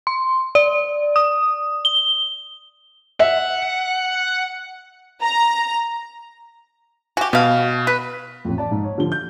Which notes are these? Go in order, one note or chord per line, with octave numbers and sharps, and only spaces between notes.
C6
D5
D#6
G7
E5 F#5
A#5
F#4 G4 G#5
B2 G3 F5
B4
A1 F2
D5 A5
G#2
C#5
D3 F3 G7
G6